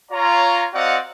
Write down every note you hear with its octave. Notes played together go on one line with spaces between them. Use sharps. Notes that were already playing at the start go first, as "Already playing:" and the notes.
F4 C#5 A#5
C4 F#4 D5 D#5 F5 F#5